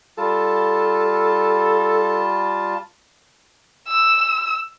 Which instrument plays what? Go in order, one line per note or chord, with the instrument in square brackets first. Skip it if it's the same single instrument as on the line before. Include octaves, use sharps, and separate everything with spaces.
[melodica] G3 F4 A5 [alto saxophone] A4
[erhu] E6